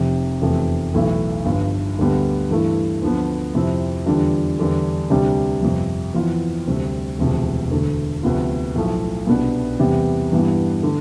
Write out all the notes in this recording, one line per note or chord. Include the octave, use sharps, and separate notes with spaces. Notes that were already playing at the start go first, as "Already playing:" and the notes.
Already playing: F1 F2 C3
F1 E2 C3 F3 A3
B1 A2 E3 A3 E4
G1 G2 F3
D2 D3 G3 B3
G2 E3 A3 E4
D2 D3 F3 B3
F2 C3 F3 C4 E4
E2 D3 G3 D4 F4
E2 D3 G3 D4
D2 C3 G3 D4
G1 F2 C3
F2 E3 B3 F4
D2 C3 G3 C4
E1 D2 C3 F3
E1 D2 D3 A3
D2 C3 F3 B3 F4
B1 A2 F3 A3
C2 B2 B3 D4
E2 C3 G3 B3
G2 E3 G3 B3
D3 A3